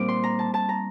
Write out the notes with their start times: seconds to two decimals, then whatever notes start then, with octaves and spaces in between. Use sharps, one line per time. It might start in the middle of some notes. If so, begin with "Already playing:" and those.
Already playing: A#2 G3 C4 D#4 D6
0.08 C6
0.24 A#5
0.39 A5
0.54 A5
0.69 A#5